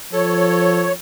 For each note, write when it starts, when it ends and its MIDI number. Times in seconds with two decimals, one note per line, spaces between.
0.13 0.93 53
0.13 0.91 69
0.13 0.92 73